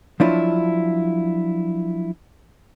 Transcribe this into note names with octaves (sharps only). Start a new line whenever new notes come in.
F3 F#3 D4 E4 F4